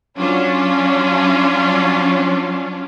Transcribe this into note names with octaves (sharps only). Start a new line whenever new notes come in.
F#3 C#4 D4 F4